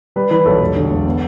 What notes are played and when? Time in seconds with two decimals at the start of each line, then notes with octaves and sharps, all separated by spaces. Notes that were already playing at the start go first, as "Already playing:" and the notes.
0.16 G3 B4
0.30 E3 B4
0.45 B1 A4
0.60 E1
0.76 D3
0.91 E1
1.06 B3